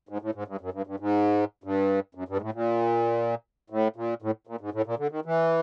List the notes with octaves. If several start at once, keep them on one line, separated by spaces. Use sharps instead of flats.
G#2
A2
G#2
G2
F#2
G2
G2
G#2
G2
F#2
G2
G#2
A2
A#2
A2
A#2
A2
A#2
G#2
A2
A#2
D3
D#3
E3